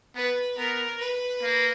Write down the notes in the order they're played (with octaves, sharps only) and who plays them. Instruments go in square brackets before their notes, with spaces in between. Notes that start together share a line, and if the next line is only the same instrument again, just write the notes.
[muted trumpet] B3 [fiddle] B4
[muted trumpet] B3 [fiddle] A#4
[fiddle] B4
[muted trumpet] A#3